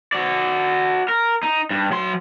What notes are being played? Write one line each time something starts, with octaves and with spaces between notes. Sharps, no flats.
F#4 D5
A#4
D#4
G2
F#3 C6